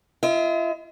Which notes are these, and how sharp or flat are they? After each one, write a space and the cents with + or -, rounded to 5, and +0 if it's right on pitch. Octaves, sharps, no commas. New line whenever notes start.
F4 -40 D#5 +45